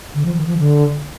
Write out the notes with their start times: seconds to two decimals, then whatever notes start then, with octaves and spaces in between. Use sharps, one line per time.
0.14 D3
0.25 F3
0.36 D#3
0.47 F3
0.58 D3